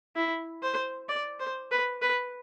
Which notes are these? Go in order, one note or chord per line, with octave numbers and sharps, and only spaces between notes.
E4
C5
D5
C5
B4
B4